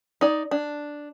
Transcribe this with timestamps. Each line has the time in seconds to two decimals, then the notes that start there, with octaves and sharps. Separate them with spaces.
0.21 D#4 D5
0.51 D4